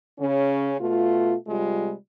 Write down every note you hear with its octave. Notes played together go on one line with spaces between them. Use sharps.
C#3 C#4
B2 A3 F4
C3 G3 G#3 F4